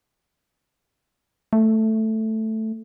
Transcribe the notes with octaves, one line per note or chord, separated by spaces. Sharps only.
A3